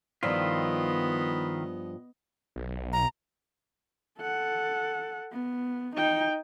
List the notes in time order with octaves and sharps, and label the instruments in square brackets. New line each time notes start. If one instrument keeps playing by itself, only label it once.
[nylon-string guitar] G2 F3 [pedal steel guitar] D#3 E4 F4 [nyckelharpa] B3 D#5
[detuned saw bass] B1
[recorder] A#5
[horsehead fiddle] A4 F#5
B3
D#4 G5